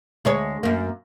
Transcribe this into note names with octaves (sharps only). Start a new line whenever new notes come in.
D2 G#3 C#5
F#2 A#3